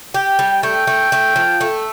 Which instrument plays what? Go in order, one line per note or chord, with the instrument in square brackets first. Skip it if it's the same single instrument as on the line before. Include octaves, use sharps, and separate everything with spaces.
[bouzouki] G4 [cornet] G5
[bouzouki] G3
[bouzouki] A3 [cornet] G5
[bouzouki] A3
A3
F3
A3